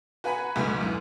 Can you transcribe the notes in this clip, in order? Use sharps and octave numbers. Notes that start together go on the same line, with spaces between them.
F#4 B4 F#5 G#5 A#5 B5
D2 G#2 C#3 F#3 A3 B4
F#2 E3